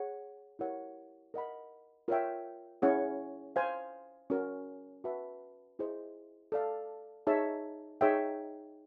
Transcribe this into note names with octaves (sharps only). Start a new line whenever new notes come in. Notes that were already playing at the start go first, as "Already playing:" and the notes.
Already playing: G#4 C#5 F#5
E4 G4 A#4 C#5 F#5
A#4 D#5 F#5 B5
F4 A#4 C#5 E5 G5
C#4 E4 G#4 C#5 F#5
C5 F5 G#5
C#4 F#4 A#4
F#4 B4 E5 A5
E4 G#4 C5 D#5
A4 D5 F5 A5
D#4 G#4 C#5 E5 A5
D#4 G#4 C#5 E5 G5